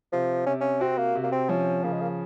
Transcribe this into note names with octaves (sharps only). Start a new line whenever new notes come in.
C3 F3
C3 C#4
C#4
C4 F#4
A#3
C3
A#3
C4
F3 C#4
C#3 A#3
G#3
A#3